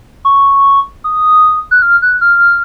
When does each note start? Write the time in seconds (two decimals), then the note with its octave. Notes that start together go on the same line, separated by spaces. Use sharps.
0.25 C#6
1.04 D#6
1.71 F#6
1.82 F6
2.02 F#6
2.21 F6